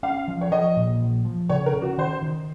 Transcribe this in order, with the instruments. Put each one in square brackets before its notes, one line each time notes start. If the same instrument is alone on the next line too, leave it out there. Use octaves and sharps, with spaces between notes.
[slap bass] C#4 [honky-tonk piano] F5
[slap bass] F3
[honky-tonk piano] C#5
[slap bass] F3 [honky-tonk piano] D#5
[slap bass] A#2
F3
F3
[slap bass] C#3 [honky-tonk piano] C#5
[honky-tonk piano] A#4
[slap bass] C#3
[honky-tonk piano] F#4
[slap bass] D#3 [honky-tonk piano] C5
[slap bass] D#3